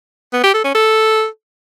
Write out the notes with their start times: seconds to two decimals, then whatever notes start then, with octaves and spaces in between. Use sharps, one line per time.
0.33 B3
0.43 G4
0.54 A4
0.64 C#4
0.75 A4